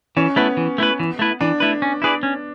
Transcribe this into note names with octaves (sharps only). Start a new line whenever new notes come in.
E3 C#4
A3 B3 E4 B4
E3
A3 E4 B4
E3
A3 E4 B4
E3 D4
A3 E4 B4
C#4
E4 G#4 B4 D5
C#4